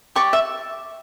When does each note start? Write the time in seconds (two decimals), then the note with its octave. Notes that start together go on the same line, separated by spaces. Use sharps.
0.15 G4 D5 C#6
0.33 E5